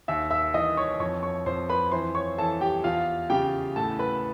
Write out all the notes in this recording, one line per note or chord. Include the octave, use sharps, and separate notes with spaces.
D#2 E5 E6
E5 E6
E3 D#5 D#6
C#5 C#6
F2 C#5 C#6
C#5 C#6
F2 C5 C6
B4 B5
E3 C5 C6
C#5 C#6
E3 A4 A5
G4 G5
E2 F4 F5
C#3 G4 G5
A2 A4 A5
B4 B5